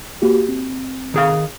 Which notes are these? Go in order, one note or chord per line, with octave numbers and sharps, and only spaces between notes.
A#3 F#4 G4
C4
D#3 G#4 F5